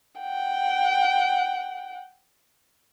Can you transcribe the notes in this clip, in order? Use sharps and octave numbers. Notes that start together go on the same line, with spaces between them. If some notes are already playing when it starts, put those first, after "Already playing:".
F#5 G5